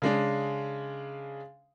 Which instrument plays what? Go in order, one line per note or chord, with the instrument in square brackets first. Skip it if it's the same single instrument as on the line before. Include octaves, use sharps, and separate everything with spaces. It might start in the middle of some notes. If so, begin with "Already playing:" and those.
[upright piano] C#3 G#3 D4